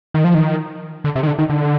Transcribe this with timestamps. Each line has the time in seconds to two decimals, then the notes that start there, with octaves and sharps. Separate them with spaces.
0.14 D#3
0.24 F3
0.34 D#3
1.04 D3
1.16 C3
1.23 D#3
1.27 D3
1.39 D#3
1.50 D3